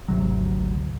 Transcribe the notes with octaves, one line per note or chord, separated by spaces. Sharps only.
G#1 D2 C3 F#3